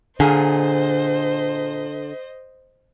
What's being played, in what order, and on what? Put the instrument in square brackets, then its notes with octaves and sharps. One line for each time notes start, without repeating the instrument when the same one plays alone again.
[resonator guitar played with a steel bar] A#2 G#4 [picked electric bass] D3 [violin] C5 D#5